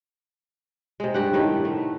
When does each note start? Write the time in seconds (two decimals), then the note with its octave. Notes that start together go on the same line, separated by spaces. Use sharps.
1.00 C3 G#3
1.14 G2 G4 F#5
1.33 A2 D#3 A3 B4
1.65 A3